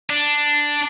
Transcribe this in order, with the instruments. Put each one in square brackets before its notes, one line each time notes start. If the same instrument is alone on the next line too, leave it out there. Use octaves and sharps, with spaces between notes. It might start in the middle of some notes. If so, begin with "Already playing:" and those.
[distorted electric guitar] D4